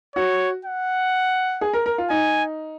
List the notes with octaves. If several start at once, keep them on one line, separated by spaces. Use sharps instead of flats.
F#4 C#5
F#5
G#4
A#4
A#4
F4
D#4 G#5